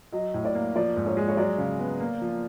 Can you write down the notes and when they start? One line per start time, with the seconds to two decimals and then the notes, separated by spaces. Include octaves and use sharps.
0.12 F#3 D#5
0.34 A2
0.45 D5
0.55 A#3
0.76 F3 D5
0.96 G#2
1.06 C#5
1.17 G#3
1.28 C#5
1.37 F#3 D5
1.58 C#3
1.79 B3
2.00 A#3
2.21 F3